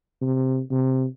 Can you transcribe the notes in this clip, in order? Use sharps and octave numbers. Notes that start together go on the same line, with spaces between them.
C3
C3